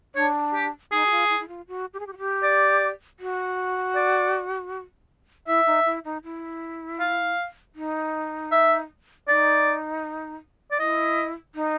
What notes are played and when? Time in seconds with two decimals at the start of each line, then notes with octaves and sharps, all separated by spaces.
0.15 D4 C#5
0.54 G4
0.92 D#4 G#4
1.06 F#4
1.11 F4
1.30 E4
1.40 E4
1.48 F4
1.68 F#4
1.94 G4
2.00 G#4
2.07 G4
2.13 F#4
2.18 G4
2.43 D5
3.20 F#4
3.96 D5
5.47 E4 E5
5.66 D#4
5.86 E4
6.05 D#4
6.24 E4
7.00 F5
7.76 D#4
8.52 E5
9.28 D#4 D5
10.72 D5
10.79 E4 D#5
11.55 D#4